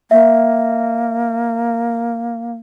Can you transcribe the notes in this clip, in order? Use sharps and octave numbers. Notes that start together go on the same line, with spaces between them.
A#3 E5